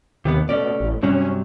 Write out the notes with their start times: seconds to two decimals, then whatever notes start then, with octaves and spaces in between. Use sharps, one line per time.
0.25 D#2 C3 D#3 B3
0.49 B2 A3 C#4 D5
0.80 A1
1.03 G2 C3 F#3 C#4